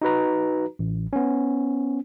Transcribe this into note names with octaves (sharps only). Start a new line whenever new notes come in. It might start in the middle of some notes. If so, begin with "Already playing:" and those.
D#4 F#4 B4 A#5
A1
B3 C#4